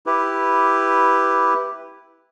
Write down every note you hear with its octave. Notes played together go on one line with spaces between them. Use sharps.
E4 G4 B4